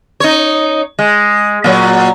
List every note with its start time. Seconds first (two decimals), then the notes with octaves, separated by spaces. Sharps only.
0.20 D#4 C#5
0.99 G#3
1.64 A#2 F#3